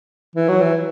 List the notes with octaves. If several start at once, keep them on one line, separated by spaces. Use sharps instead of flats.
E3
F#3
E3